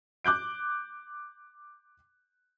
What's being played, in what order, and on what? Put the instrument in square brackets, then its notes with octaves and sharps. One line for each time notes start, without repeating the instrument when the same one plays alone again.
[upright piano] D6 F#6 G6 D7